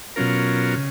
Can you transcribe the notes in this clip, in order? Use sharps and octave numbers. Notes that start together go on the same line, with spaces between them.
B2 F#3 C#4 F4 A#4
C#3